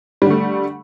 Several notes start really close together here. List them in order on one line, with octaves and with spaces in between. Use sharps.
G3 D3 A3